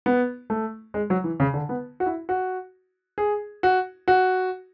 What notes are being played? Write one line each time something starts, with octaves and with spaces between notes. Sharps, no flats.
B3
A3
G#3
F#3
E3
C#3
D3
B3
F#4
E4
F#4
G#4
F#4
F#4